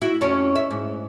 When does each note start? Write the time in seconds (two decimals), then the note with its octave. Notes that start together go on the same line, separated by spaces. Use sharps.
0.02 E4 F#4
0.21 F2 C#4
0.55 E5
0.70 G#2